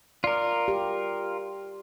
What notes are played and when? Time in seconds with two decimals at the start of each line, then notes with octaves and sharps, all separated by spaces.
0.24 F4 A#4 D5
0.68 G4